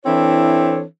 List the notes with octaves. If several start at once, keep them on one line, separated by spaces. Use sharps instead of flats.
E3 C4 D4 E4 A4 C#5